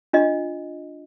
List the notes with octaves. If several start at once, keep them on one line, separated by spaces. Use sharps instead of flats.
D4 F4 D#5